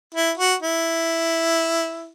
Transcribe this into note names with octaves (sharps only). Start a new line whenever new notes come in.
E4
F#4
E4